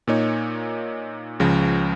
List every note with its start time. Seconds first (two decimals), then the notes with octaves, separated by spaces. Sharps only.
0.07 A#2 A#3 D#4 C#5
1.40 C#2 C#3 F3